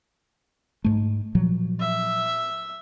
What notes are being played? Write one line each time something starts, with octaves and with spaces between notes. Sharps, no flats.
G#2 A3
A#2 F3 F#3
E5